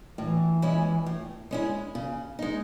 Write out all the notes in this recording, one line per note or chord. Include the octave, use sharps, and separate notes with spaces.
A2 E3
G#3 C#4 E4
A2
G#3 C#4 E4
C#3
G#3 D#4